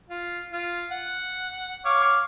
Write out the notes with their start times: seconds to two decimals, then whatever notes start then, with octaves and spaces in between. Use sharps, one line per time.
0.09 F4
0.52 F4
0.91 F#5
1.85 C#5 F5 D6